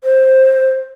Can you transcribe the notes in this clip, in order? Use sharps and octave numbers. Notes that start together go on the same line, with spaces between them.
C5